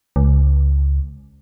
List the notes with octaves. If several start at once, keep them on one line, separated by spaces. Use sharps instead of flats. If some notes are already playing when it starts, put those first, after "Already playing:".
C#2